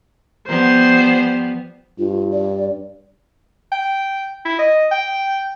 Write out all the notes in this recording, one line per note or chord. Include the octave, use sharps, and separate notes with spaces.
F3 G3 B3 C5
G2 F4
D5
G5
E4
D#5
G5